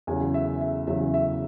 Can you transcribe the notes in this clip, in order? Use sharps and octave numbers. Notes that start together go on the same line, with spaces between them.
E2 C#3 F#3 G#5
E5
E5
E2 C#3 F#3 E5
E5